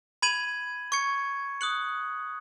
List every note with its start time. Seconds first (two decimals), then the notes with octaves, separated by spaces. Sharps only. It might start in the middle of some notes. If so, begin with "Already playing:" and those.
0.22 B5 G#6 D#7 F#7
0.92 C#6 G#6 C#7
1.61 D#6 F#6 C#7 F#7